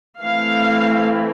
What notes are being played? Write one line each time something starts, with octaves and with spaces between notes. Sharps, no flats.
E3 A3 C4 E4 F5